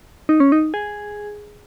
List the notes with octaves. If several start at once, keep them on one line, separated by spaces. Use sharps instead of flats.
D#4
C#4
D#4
G#4